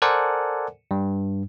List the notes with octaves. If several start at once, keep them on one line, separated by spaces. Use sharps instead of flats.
A4 A#4 C5 D5 F#5 G#5
G2